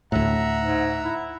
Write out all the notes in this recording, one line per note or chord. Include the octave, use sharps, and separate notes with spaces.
D2 A2 E5 F#5 A#5
G#2
E4